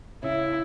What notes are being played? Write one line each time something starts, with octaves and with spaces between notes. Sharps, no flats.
C#3 E4